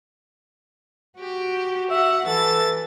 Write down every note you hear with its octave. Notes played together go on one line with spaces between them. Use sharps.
F#4 G4
E5 F#5
E3 A4 A6